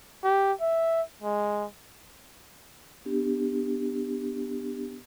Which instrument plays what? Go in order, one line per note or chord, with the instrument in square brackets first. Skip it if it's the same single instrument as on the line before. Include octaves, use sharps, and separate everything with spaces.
[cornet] G4
E5
G#3
[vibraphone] B3 D4 G4